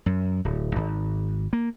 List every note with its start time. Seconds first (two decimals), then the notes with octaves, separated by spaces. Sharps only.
0.06 F#2
0.45 D1
0.76 G#1
1.53 A#3